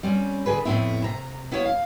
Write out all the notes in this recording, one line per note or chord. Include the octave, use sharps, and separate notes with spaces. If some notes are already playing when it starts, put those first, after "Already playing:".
G3 C4 C#4
D3 G#4 B4
F2 A2 C3 B3 C4 E4
C3 A#5
B3 E4 C5 C#5 F5 F#5
F5